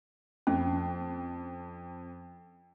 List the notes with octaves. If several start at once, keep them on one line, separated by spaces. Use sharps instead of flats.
F2 C#4